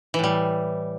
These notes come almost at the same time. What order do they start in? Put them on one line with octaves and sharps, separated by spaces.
E3 A2 G3